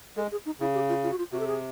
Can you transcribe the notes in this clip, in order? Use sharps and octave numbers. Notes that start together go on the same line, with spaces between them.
G#3 A4
G#4
D#4
C#3 E4
G4
F4
F4
F#4
F4
C3 F#4
A4
G#4